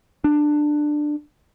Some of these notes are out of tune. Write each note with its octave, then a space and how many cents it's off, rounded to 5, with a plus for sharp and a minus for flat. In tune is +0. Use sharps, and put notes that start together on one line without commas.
D4 +15